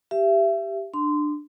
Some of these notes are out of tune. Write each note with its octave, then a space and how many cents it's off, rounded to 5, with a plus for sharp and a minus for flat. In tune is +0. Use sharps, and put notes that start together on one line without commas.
G4 +0 E5 +30
D4 +20 C6 -20